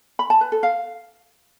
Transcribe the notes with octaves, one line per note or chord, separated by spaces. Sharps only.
B5
A5
B4
A4
F5